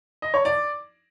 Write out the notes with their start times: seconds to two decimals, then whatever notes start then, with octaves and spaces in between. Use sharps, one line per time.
0.22 D#5
0.34 C#5
0.45 D5